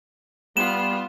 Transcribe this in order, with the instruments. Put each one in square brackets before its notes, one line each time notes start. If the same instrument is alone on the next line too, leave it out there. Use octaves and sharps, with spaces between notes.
[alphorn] G3 [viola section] B3 F4 [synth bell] E7